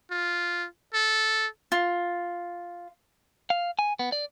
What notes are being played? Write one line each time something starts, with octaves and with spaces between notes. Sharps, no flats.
F4
A4
F4
F5
G#5
B3
D5